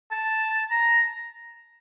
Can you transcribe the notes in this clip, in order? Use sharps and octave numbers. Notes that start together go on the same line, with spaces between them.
A5
A#5